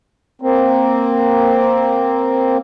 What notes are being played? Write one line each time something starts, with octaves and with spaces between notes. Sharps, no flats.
A#3 C4